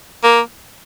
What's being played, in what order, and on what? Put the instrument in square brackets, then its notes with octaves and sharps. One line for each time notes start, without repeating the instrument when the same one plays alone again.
[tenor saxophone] A#3